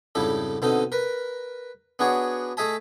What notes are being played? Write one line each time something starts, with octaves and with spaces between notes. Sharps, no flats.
F2 G#2 C#3 G3 E4 A4
B2 D3 C4 D#4 A4
A#4 B4
B3 D4 F#4 G#4 C#5
A3 G#4 D#5 E5 G#5 A5